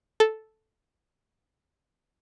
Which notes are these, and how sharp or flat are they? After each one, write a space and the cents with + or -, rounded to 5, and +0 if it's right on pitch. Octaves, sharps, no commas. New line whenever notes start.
A4 -5